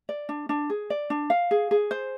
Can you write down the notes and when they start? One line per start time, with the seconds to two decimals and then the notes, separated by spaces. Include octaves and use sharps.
0.09 D5
0.29 D4
0.49 D4
0.70 G#4
0.90 D5
1.10 D4
1.30 F5
1.51 G#4
1.71 G#4
1.91 C5